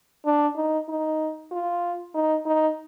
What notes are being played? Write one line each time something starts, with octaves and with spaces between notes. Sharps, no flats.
D4
D#4
D#4
F4
D#4
D#4